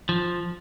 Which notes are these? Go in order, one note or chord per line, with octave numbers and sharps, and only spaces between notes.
F3